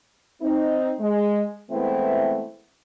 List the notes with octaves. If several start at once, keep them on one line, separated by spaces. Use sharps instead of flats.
C4 D#4
G#3
E3 G#3 A3 B3 C4 E4